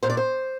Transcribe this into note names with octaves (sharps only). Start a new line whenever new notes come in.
A#2 C5
D5
C5